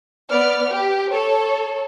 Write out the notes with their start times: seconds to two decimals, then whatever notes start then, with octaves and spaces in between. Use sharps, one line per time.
0.31 B3 D5 F6
0.70 G4
1.12 A4 C#5